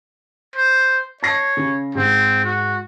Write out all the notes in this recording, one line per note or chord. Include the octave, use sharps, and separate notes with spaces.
C5
C#5 A5 A#6 C7
C#3
G#2 C4
F#4